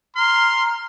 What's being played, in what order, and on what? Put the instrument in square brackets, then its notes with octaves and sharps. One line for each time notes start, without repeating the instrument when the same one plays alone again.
[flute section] A#5 F6 [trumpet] C6